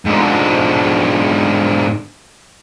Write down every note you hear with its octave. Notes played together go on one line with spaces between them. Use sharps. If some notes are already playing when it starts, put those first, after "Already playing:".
G#2 D3